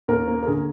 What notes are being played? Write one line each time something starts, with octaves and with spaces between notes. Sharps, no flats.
D#2 A#4
A#3
A#4
D3 G#4